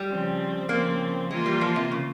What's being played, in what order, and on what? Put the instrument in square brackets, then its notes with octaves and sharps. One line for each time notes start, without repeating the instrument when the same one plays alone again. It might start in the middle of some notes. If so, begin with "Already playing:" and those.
Already playing: [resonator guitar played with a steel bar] G3
[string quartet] C#3 F3 C4
[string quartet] C#3 F3 C4 [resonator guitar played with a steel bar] A#3
[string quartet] E3 A#3 F4 [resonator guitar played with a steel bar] G#3
[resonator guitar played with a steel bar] G3
F3
C3
C#3